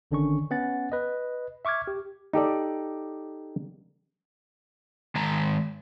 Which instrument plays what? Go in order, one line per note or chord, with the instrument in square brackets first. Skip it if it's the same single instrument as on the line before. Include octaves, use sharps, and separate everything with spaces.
[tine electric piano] G#1 D3 D#3 C#4 D4 C#6
B3 C#4 F#5 A6
B4 D#5
E5 C#6 D6 F6 G#6
G4
[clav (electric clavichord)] D#4 G4 A4 D5
[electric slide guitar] D#3 G#3 A5 A#5